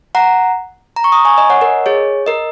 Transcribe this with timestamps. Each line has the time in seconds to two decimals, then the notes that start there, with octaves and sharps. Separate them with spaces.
0.15 F#5 A#5
0.97 A#5
1.04 C#6
1.12 A#5 D#6
1.25 G#5 C#6
1.38 D#5 G#5
1.50 C#5 F#5
1.61 A#4 D#5
1.86 G#4 C#5
2.26 A#4 D#5